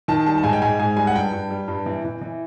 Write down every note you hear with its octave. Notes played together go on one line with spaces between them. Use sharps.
D#3 A5
G3 A5
A5
G#2 G#5
G5
G#2 G#5
G#2 G#5
G3 G#5
F#5
G2 G5
G2
G3
G2
E3
E3
E3